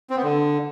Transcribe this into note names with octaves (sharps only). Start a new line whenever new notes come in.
C4
B3
D3